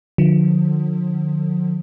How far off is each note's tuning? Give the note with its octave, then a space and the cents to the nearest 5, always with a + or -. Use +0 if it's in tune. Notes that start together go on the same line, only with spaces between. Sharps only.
D3 +40 F3 +40